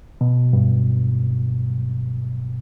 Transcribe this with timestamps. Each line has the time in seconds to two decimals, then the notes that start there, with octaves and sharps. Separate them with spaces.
0.21 B2
0.53 G2